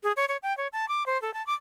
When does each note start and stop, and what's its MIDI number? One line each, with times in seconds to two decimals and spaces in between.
0.03 0.12 68
0.16 0.25 73
0.28 0.37 73
0.43 0.55 79
0.57 0.67 73
0.72 0.88 81
0.88 1.06 86
1.06 1.20 72
1.22 1.33 69
1.34 1.44 81
1.46 1.54 86